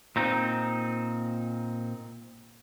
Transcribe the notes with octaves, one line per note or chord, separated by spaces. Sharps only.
A#2 C4 D#4